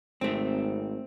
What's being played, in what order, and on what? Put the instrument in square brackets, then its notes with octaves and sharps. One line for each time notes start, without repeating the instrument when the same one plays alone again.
[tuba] G#1 [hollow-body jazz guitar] A3 C4